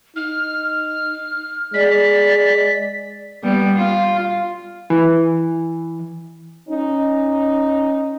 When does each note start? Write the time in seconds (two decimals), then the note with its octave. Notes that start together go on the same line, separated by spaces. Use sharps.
0.16 D#4 F6
1.74 G#3 D5 B6
3.43 G3 B3
3.75 F4
4.90 E3
6.69 C#4 D#4